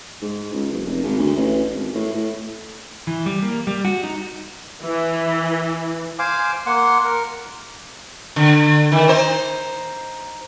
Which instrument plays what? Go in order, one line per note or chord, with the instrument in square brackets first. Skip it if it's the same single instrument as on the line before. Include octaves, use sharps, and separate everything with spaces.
[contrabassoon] G#2
C#2
F#1
F1
G#1
D2
A1
G#1
A2
A2
[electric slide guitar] E3
G3
A#3
G3
F#4
D#4
[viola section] E3
[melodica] C5 F5 G#5 D6
A#3 F#5 C6
A#4
[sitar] D3
D#3
D#4 C5